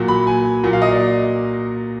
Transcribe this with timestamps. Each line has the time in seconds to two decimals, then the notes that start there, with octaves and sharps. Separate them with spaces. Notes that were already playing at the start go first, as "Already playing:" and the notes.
Already playing: A#2 F#3
0.08 B5
0.27 G#5
0.64 A#2 F#3
0.73 F5
0.82 D#5
0.91 D5